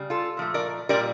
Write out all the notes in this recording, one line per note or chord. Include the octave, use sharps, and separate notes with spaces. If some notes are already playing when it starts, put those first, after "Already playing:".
Already playing: C#3 G3
F4 A4
A#2 F3 A3
A#4 D5
A#2 G3 A#4 D5